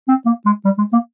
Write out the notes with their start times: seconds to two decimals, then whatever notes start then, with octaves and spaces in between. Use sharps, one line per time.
0.08 C4
0.26 A#3
0.46 G#3
0.65 G3
0.78 G#3
0.93 A#3